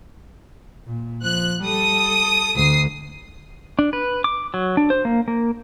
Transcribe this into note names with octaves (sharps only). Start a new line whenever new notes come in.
A#2
F3 F#6
G3 A4 D#6
D2 D3 D#6 C7
D4
B4
D6
F#3
D4
C5
A#3
A#3